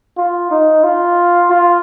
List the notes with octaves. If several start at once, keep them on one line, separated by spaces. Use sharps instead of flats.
F4
D#4
F4
F4